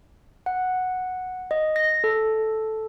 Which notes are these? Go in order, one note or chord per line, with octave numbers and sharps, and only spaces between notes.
F#5
D#5
A#6
A4